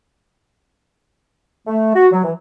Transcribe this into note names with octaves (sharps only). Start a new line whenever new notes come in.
A3
F#4
F#3
E3